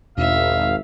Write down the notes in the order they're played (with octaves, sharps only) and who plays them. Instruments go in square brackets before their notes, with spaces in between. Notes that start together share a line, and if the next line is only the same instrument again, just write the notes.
[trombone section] G#1 [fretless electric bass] E2 B2 D4 [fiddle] E5 [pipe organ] F5